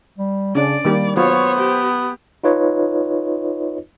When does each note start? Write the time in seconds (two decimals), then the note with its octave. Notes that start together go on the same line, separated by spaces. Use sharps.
0.18 G3
0.55 C#3 C#4 D4 D5
0.85 D#3 G3 A#3 G4
1.17 F#3 B3 F4 C5 C#5
1.59 G4
2.44 D#4 F4 B4 C#5 D#5